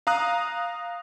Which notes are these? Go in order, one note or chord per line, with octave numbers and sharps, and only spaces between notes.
F5 A#5 D#6 F#6